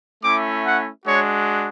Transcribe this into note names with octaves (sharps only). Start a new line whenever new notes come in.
A3 C#4 E4 D6
F#5
G#3 D4 F#4 C#5